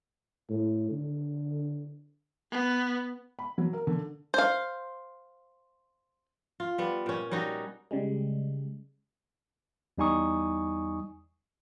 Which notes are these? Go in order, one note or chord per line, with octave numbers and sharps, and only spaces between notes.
A2
D3
B3
B5
F#3
A#4
D3
C5 F5
F4
G3 B3
A#2 C#4
G3 C#4 D#4 F#4
C#3 G3 G#3
E2 G3 D#4 G#5 C#6 D#6